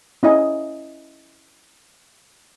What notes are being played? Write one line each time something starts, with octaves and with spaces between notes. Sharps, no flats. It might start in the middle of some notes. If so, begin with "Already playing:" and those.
C#4 E4 D#5 G#5